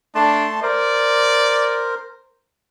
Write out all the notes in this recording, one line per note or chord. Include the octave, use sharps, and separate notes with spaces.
A3 D4 A5 C6
A#4 C5 D5